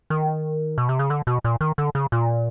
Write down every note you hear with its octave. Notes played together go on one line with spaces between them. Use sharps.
D#3
B2
C3
C#3
D3
B2
A#2
D#3
D3
C#3
A#2